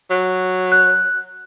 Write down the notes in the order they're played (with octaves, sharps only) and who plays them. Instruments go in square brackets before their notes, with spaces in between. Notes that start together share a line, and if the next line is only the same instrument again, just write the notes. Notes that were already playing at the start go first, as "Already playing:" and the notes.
[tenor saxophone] F#3
[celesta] F#6